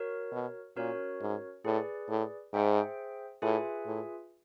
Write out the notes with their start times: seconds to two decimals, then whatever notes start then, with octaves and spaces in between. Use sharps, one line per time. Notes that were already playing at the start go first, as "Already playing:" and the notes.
Already playing: F#4 A#4 C#5
0.32 B2
0.76 A#2 C#4 F#4 A#4 C#5
1.21 G#2
1.65 A2 G#4 B4 D5
2.09 A2
2.53 G#2 G#4 C5 E5 G5
3.42 A2 F4 G#4 B4 E5 G#5
3.86 A2